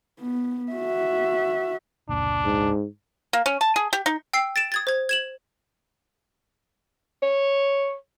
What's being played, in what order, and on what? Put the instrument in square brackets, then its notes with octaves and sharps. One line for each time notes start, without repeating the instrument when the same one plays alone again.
[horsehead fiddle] B3
F#4 E5
[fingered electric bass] F1 C#2 A#2 [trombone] D4
[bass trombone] G#2
[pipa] A#3
C#4
A5
G#4
G4
D#4
[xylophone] G5 E6 C7
A6 D7 E7
D#6 G#6 A6
C5 G#6
G#6 E7 F#7
[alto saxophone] C#5